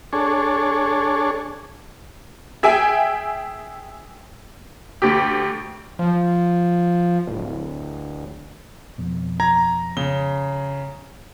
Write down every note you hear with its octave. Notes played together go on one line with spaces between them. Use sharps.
D4 G#4 A4 C#5
G#4 E5 G5 G#5
D2 G4
F3
D1
F2 B2
A#5 G#6
C#3 G7